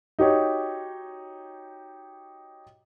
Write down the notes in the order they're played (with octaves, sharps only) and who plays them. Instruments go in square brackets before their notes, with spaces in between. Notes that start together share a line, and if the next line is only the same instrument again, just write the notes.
[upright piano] D#4 F#4 G4 C#5